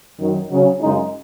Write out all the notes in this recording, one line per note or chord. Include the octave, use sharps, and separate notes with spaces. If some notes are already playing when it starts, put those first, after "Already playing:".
F#2 D#3 F#3
C#3 F#3 C#4
F#2 C#3 G#3 D#4